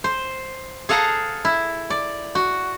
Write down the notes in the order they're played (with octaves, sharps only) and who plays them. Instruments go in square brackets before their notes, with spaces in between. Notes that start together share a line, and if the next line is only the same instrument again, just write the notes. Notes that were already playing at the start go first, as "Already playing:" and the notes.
[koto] C5
G#4 A4 F5 F#5 A#5
E4
D5
F#4